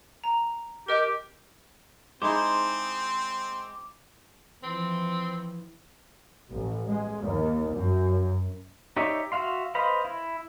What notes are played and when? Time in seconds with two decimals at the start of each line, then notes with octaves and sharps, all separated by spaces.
0.24 A#5
0.88 G4 A#4 D#5
2.22 G#3 C4 D#4 E4 C5 D6
4.63 E3 F3 C4
6.50 A1
6.87 G#3
7.21 D#2
7.74 F#2
8.97 D#4 G4 C#5 D5 E5
9.32 F#4 E5 F5 C6
9.75 B4 C5 D#5 F5 B5
10.05 E4